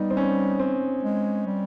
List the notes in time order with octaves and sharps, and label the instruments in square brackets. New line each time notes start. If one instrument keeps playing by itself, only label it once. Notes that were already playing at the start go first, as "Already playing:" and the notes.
Already playing: [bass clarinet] G3 [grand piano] B3 D#4
[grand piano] C4
C#4
C4
[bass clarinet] G#3
G3